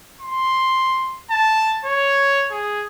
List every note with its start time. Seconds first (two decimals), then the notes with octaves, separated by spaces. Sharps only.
0.21 C6
1.30 A5
1.85 C#5
2.51 G#4